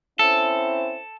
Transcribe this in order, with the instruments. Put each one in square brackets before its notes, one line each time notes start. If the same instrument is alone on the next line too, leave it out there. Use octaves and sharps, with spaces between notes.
[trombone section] C4 C#4 E4 [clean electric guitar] A4